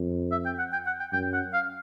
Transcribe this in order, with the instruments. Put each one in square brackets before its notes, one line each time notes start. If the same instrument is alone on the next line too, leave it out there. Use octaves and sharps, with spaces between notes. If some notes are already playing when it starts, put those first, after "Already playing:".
Already playing: [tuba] F2
[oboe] E5
G5
F#5
G5
F#5
G5
[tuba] F#2 [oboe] G5
[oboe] F#5
F5